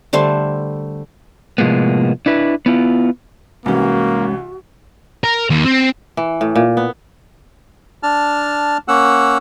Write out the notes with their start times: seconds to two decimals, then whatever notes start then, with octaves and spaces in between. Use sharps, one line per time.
0.13 D3 G3 A3 C5
1.58 A2 C3 F3 G#3 A#3 B3
2.26 D4 E4 B4
2.66 B3 E4 F4
3.66 C2 G#2 E3 A#3 C#4 F#4
5.24 A#4
5.50 D#2
5.65 C4
6.17 E3
6.41 A2
6.56 A#2
6.77 B3
8.03 D4 A5 F6
8.88 A#3 C#4 F#5 E6